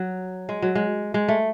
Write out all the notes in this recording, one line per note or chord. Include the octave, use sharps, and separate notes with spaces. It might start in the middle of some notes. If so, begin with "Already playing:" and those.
Already playing: F#3
G#3
F#3
G#3
G#3
A3